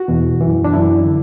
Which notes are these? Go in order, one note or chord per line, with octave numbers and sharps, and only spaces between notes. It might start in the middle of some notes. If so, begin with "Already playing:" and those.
Already playing: F#4
E2 B2
F#2 E3
D4
F#2 E3 E4
D3